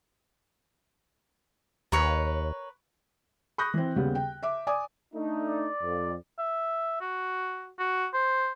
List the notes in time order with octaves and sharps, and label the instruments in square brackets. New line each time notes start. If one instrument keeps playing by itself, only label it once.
[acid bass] D#2 [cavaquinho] A#4 B4 C#5
[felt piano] B5 C#6 D#6 F#6 G6 A#6
E3 C4
D#2 C#3 G3 B3
G5
E5 D6
D5 G#5 D6 D#6
[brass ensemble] A3 D4 D#4
[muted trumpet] D5
[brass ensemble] F2
[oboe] E5
F#4
F#4
C5